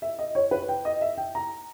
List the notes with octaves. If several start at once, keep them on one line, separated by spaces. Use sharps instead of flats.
E5
D#5
C#5
B4
G5
D#5
E5
G5
A#5